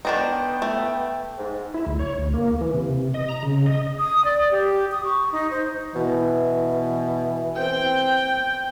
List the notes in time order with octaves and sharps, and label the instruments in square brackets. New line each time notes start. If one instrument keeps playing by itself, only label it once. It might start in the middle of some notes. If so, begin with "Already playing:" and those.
[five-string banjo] D#3 D4 D#4 [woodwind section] B3 G5
[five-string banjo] A3
[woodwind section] G#2
[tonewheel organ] E4
D2
C#5
D2
A#3
E3
C3
D#5
A#5
C#3
D#5
[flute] D#6
D5
G4
D#6
C#6
D#4
C5
[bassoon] B2 [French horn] E3
[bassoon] C4 [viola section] G5